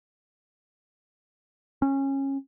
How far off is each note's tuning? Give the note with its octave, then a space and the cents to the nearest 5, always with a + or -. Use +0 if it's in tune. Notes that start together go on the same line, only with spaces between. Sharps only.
C#4 -20